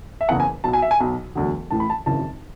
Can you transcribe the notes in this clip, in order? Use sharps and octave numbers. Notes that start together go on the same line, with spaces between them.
E5
F#1 E2 C#3 F#5
G#5
B1 B2 F#3 A5
G#5
E5
G#5
B1 B2 F#3
E1 D2 D3 F#3
A1 A2 E3 A5
B5
A5
G#1 F#2 C#3 E3 A5